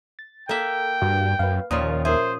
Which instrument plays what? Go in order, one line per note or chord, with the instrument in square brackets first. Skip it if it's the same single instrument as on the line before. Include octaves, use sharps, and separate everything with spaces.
[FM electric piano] A6
[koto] A#3 E5 [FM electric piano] A4 [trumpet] G5
[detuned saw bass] G2 [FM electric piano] F#4
[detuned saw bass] F#2 [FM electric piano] B4 F5
[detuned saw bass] D#2 [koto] A#2 F3 C#4 [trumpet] F4 [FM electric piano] C6 D#6
[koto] G#4 [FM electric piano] A#4 E5 [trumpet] C5